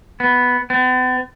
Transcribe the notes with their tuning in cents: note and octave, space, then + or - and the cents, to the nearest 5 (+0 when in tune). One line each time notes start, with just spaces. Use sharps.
B3 +0
B3 +45